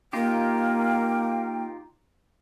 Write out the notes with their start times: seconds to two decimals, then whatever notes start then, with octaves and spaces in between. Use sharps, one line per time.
0.13 A#3 D#4 F4 G4 G5